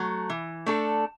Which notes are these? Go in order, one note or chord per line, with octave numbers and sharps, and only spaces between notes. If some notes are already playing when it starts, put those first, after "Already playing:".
Already playing: F#3 A3
E3
A3 D4 A4